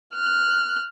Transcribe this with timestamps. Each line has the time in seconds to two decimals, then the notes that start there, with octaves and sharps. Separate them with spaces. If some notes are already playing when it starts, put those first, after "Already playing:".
0.14 F6 F#6